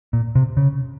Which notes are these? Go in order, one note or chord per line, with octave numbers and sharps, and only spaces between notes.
A#2
C3
C#3